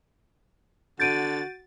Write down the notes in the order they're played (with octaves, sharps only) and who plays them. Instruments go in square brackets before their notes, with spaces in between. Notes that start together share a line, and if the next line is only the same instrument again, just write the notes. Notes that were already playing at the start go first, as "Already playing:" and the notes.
[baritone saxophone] D3 [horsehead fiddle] F#4 [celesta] G6 D7 D#7 [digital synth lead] A6